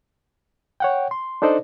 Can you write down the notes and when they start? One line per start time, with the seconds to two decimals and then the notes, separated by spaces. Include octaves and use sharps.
0.80 C#5 F#5 G5
1.11 C6
1.42 D4 D#4 A4 C5 D5 D#5